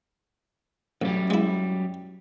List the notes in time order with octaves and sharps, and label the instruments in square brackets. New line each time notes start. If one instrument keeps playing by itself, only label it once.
[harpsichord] A1 [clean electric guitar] F#2 G3
[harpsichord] G#3 E4